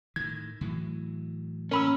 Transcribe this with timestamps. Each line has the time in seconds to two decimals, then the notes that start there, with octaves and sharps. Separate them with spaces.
0.16 A2 D#3 G#6
0.61 A2 E3 F#3
1.71 A#3 C#4 A#4 B5 E6